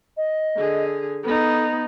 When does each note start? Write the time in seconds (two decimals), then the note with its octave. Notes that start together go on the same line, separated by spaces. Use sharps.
0.17 D#5
0.57 D3 G#4
1.24 B3 D#4 A4